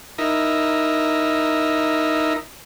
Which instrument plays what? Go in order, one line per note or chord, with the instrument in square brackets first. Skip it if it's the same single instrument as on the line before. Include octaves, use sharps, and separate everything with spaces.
[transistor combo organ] D#4 E4 A#4